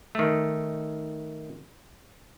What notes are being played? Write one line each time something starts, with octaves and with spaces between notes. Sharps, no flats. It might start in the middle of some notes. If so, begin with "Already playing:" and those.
D#3 A3